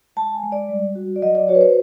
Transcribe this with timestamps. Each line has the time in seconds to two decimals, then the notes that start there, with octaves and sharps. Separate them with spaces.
0.16 G#3 A5
0.35 G#5
0.43 G#3
0.52 D5
0.69 G3
0.95 F#4
1.16 D5
1.22 F#3 D#5
1.35 D5
1.48 F#4 C#5
1.55 B4
1.61 C5